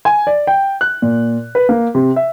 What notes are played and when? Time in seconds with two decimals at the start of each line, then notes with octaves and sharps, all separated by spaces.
0.05 G#5
0.27 D5
0.47 G5
0.81 F#6
1.02 A#2
1.55 B4
1.69 A#3
1.95 C3
2.16 E5